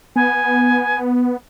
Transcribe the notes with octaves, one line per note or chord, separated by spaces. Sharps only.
B3 G#5